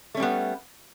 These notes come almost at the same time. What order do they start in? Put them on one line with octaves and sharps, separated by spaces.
A3 C#4 G3 B3